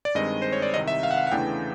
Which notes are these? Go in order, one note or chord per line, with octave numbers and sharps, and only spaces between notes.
D5
G2 D#3 G#3 C4 D#5
C5
C#5
D5
C2 C3 D#3 D#5
E5
F5
F#5
F5
F#5
E2 C#3 E3 A3 D4 G5